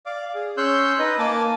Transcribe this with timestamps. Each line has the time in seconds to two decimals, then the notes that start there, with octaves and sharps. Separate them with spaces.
0.06 D5 F5 D6
0.35 G#4
0.57 C#4 C#5 C6 E6 F#6 G6
0.99 D#4 B4 D#5
1.18 A#3 G#5 A5 D6